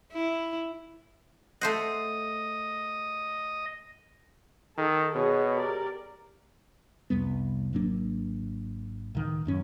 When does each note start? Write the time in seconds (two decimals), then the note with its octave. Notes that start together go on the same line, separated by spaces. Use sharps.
0.13 E4
1.61 A3 C5 D#5 F#5
4.78 D#3 A4
5.15 B2 G#4 C#5
5.55 G4 A#4 D5
7.10 C2 F2 G3 B3
7.73 G#1 F#3 A#3 D4
9.15 C#2 A2 D#3
9.45 D1 F#2 C#4